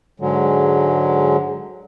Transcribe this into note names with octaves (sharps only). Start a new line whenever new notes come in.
G#2 D3 F#3 G#3